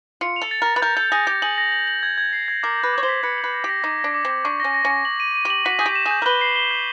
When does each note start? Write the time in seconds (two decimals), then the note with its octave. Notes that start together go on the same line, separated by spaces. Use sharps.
0.21 F4 C#7
0.36 F7
0.42 A4
0.51 A6
0.62 A#4 A6
0.76 B4
0.82 A#4 G6
0.96 A4 G6
1.12 G#4 A#6
1.27 G4 G6
1.42 G#4 F#7
1.58 A#6
1.72 F#7
1.87 F#7
2.03 G#6
2.18 G#6
2.33 C7
2.48 G#6
2.63 A#4 D6
2.79 B4 G6
2.93 C#5 D6
3.03 C5
3.08 B6
3.23 B4 C#7
3.38 F#7
3.44 B4
3.54 A#6
3.64 G4 A#6
3.84 D#4 D6
3.99 A#6
4.04 D4
4.14 D6
4.25 C4
4.30 D6
4.45 D4 C#6
4.60 C#4 A#6
4.75 A#6
4.85 C#4
4.90 C#6
5.05 F#7
5.20 D#7
5.35 D#7
5.45 G4
5.50 F#7
5.65 F#4 B6
5.79 G#4 G6
5.86 G4
5.95 E7
6.06 G#4
6.11 G6
6.22 A#4
6.26 B4 G7
6.41 C7
6.56 G7
6.71 G6